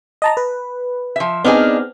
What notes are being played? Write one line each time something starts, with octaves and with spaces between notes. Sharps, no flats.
D#5 A5 A#5
B4
F3 E5
B3 C4 D4 D#4 G#4 F6